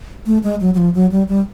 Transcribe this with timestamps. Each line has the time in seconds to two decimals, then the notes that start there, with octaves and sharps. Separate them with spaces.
0.26 A3
0.43 G#3
0.60 F#3
0.74 F#3
0.78 F3
0.95 F#3
1.12 G3
1.28 G3